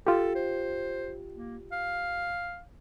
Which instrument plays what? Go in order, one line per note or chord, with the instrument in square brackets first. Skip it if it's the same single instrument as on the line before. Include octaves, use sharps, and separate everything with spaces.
[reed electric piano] F4 G4 [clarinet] A4
[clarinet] C5
A#3
F5